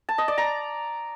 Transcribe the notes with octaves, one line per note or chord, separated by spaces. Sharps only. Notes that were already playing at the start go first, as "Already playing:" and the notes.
A5
D#5
D5
A#5